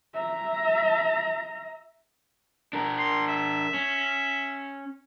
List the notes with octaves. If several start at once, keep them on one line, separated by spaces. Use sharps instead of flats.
E5 A#5
D4 A#4
C6
E5
C#4